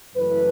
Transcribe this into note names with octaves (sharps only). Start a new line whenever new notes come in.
F#1 F#2 E3 A3 B4